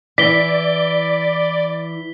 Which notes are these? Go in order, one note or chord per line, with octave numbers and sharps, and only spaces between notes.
E3 D5 B6 G7